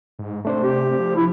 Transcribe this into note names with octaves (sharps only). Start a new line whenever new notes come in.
G#2
C3 A3 D4 C5
G4
F3
E4